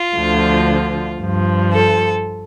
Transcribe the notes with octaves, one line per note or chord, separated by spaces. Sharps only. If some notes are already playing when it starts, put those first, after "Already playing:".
Already playing: F4
D2 D3 F3
G2 F3
A4